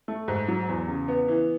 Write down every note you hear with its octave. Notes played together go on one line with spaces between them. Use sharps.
A3
G#2
F#3
E2
C#3
B3
E3